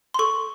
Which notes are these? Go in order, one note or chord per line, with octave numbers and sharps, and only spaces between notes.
C6
A4 C#6